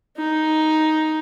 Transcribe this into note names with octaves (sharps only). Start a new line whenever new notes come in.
D#4